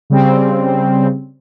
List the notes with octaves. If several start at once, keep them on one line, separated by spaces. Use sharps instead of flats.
C#3 G3 C4